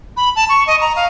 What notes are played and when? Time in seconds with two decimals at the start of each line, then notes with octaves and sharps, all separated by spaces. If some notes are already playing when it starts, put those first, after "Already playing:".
0.17 B5
0.36 A5
0.49 C#6
0.67 D#5
0.81 A#5
0.96 F5